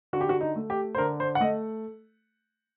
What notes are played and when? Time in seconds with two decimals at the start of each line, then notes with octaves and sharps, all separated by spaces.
0.13 D3 F#4
0.21 G4
0.29 F#4
0.41 D#4
0.56 A3
0.70 G4
0.95 C5
0.98 D3 A#4
1.20 C5
1.35 F#5
1.40 A3 D#5